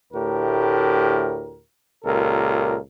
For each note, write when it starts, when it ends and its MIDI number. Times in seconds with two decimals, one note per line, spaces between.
0.13 1.60 38
0.13 1.60 45
0.13 1.60 67
0.13 1.60 70
2.04 2.78 37
2.04 2.78 46
2.04 2.78 67
2.04 2.78 69
2.04 2.78 70